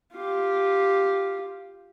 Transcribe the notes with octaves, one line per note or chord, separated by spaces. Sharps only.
F4 G4